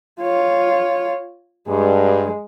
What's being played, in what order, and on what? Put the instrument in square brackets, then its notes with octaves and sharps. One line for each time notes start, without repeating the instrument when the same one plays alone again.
[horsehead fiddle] F4 C#5
[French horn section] G2 [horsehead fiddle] G#3